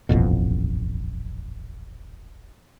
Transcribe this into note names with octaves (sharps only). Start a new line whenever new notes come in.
D#1 A1 F2 B2